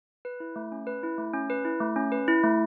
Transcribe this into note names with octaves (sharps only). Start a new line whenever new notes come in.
B4
E4
A3
C#4
B4
E4
A3
C#4
B4
E4
A3
C#4
B4
E4
A3